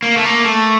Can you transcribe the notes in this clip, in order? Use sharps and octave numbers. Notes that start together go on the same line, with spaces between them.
A#3
A3
A#3
A3